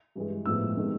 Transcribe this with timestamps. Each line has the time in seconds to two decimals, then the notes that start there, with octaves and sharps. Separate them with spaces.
0.15 G2 E3 G#3
0.46 A2 F3 G#3 B3 E6
0.76 C3 D#3 G#3 B3